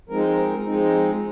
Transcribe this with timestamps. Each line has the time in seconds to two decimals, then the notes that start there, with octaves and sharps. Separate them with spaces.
0.09 F3 G#3 C4 D#4 A#4
0.19 C5
0.27 A#4
0.66 F3 G#3 C4 D#4